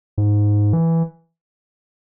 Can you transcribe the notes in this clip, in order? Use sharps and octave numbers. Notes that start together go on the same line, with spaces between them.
G#2
E3